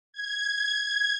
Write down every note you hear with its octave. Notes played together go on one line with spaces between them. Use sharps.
G#6